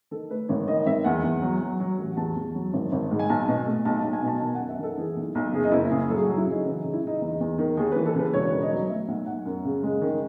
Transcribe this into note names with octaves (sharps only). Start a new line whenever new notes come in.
D#3 A4
A3 B4
G#1 C#5
D#3 D#5
G#1 E5
E2 F#5
E2
F#3
F#3
F#3
A1
E2 A5
E2
F#3
G#1
G#1
G#2
G#5
B1 A5
B2
A3
B1 A5
B1 A5
G#5
B2 A5
D#3 A5
F#2 F#5
E5
D#3 A4
E3 G#4
B1
B1
F#1 G#4
D#4
F#1 E4
C#3 G#4
F#3 A4
G#4
F#3 F#4
E4
C#3 D#4
E3 C#4
C#3 D#4
E4
C#3 D#4
E2 D#4
E2
D#3
D#2 G#4
E3 B4
A4
C#3 B4
E1 C#5
D#3
D#5
F#3
A3 E5
B1 F#5
B1 F#5
F#2
C#3
G#3
D#3